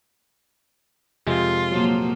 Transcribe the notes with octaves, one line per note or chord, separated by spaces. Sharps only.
F2 C3 G#3 F4
A#2 F3 F#3 A#3